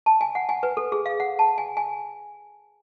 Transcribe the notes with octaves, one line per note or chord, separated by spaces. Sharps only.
A5
G#5
F#5
G#5
B4
A4
G#4
F5
F#5
A5
G#5
G#5